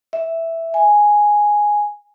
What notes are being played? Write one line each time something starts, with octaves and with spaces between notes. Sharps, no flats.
E5
G#5